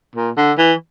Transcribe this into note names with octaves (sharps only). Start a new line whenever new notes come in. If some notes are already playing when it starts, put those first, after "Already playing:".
A#2
D3
E3